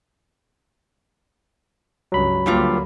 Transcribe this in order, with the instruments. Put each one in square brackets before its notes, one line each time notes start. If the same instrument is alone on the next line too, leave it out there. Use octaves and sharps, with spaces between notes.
[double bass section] C#2 G2 [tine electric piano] F#3 B5
[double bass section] D2 A#3 [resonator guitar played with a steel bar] G2 G3 F4